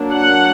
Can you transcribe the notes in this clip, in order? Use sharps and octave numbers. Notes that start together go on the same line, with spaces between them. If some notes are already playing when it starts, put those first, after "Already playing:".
Already playing: F#3 A#3 D4
F#5